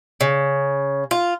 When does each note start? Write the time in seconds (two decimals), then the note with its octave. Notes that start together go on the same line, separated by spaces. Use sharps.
0.21 C#3
1.11 F4